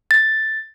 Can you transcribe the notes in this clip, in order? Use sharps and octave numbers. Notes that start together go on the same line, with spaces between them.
A6